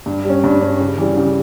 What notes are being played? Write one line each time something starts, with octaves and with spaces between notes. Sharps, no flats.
G2
G3 C#4
G2
G3 C#4
C#3
E3 G3
C#3